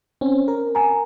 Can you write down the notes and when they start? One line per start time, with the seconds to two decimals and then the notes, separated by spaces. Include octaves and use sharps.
0.21 C4 C#4
0.48 A#4
0.75 G#5 A#5